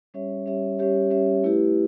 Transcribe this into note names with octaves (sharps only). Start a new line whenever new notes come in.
G3 C#4 G4 C#5 E5
G3 C#4 G4 C#5 E5
G3 C#4 G4 C#5 E5
G3 C#4 G4 C#5 E5
A3 E4 G4 B4